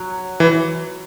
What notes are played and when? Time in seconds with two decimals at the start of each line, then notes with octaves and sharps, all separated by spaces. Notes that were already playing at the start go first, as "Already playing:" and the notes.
Already playing: F#3
0.40 E3